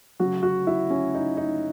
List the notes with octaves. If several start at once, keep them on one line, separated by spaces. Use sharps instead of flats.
C#3 F#3 F#4
F#4
E4
C#4
D#4
D#4